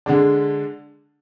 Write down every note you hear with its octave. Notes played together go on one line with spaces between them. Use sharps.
D3 G#3 D4